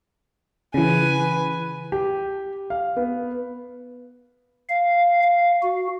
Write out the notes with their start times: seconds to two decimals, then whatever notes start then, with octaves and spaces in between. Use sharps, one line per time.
0.74 C#3 E3 B4 G#5
1.92 G4
2.70 F5
2.97 B3
4.69 F5
5.23 F5
5.62 F#4